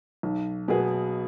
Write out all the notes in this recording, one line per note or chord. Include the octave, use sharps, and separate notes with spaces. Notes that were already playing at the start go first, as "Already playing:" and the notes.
B1
B2 F#3 B3 G#4